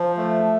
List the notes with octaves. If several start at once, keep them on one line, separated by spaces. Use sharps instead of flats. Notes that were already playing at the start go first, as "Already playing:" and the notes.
Already playing: F3
A3